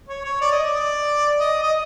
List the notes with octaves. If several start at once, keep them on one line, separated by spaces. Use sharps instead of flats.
C#5
C#5
D5
D#5
D5
D#5
D#5